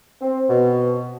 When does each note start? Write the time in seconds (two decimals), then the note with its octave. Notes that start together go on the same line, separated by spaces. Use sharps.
0.21 C4
0.50 B2